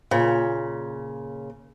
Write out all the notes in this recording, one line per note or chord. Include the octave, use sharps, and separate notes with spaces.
A#2 C#3